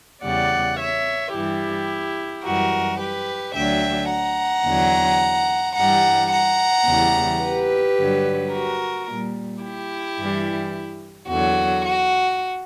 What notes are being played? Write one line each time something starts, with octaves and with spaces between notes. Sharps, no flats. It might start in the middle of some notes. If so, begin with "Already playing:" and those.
E2 C#3 G3 D5 F#5
C#5 E5
G2 E3 G3 E4 G4
F#2 E3 G3 F#4 A#4
G4 B4
D2 D3 F#3 E5 G5
F#5 A#5
E2 D3 F#3
G2 E3 G3 F#5 A#5
F#5 A#5
E2 C#3 E3 G3
G4 B4
G2 D3 F#3
F#4 A#4
A#2 G3
E4 G4
G2 E3 G3
E2 D3 F#3 F#4
F#4